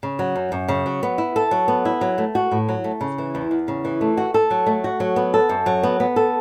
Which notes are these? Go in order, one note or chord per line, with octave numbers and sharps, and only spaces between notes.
C#3
F#3
F#2
F#2
C#3
F#3
B3
E4
A4
F#3
B3
E4
F#3
A3
F#4
A2
F#3
A3
C#3
E3
E2
E2
C#3
E3
A3
F#4
A4
F#3
A3
F#4
F#3
B3
A4
F#2
F#3
B3
B3
A4